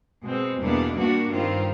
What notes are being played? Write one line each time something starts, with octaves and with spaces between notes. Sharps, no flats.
B2 G#3 C4
E2 B2 G3 A#3 D4
A#2 G3 A#3 D4 F#4
G2 D#3 G3 C4 F4